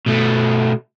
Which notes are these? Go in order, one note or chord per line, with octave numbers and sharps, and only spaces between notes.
B2 A3